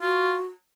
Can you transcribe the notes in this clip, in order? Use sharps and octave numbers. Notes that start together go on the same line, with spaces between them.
F4 F#4